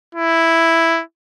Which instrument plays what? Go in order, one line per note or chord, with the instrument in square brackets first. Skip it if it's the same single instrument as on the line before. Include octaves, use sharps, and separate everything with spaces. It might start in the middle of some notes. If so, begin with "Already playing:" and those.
[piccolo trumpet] E4